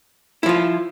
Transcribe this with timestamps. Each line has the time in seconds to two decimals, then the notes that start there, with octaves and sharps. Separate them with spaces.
0.43 E4
0.46 F3
0.49 F4